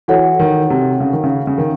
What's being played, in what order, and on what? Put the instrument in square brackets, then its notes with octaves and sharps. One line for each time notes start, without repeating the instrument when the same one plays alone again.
[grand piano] E3 [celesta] F#4 A4 C#5 F#5
[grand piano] D#3
C3
C#3
D#3
C#3
C#3
D#3